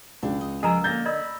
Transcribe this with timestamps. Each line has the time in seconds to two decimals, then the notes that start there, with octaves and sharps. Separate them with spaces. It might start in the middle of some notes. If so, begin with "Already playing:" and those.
0.23 C#2 D4
0.41 D#5
0.63 F3 G#4 A#4 D#5 G5 A#5 E6
0.84 D3 A#3 G6 A6 A#6
1.06 A#4 D5 D#5 B5 E6